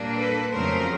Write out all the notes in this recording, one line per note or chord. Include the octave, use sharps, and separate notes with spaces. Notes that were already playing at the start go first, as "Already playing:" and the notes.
Already playing: A#2 G3 A#3 D4
A4 B4
F2 C#3 F#3 A3 A#4 C5